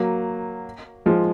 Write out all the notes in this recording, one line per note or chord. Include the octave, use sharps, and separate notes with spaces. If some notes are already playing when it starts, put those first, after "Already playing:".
Already playing: F#3 A#3
F3 G#3